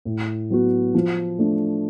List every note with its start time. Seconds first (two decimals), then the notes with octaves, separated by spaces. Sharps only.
0.05 A2
0.50 F#3 B3 F#4
0.94 F3
1.39 A3 D4